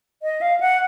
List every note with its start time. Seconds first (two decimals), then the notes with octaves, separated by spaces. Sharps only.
0.22 D#5
0.41 F5
0.60 F#5